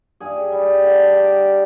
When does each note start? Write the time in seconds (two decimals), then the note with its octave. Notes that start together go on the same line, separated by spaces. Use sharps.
0.20 G2 G#4
0.52 G3
0.83 D3
1.13 G2 G4